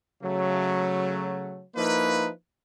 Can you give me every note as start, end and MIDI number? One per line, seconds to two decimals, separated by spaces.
0.22 1.63 49
0.22 1.63 54
0.22 1.63 57
1.75 2.29 53
1.75 2.29 58
1.75 2.29 63
1.75 2.29 64
1.75 2.29 71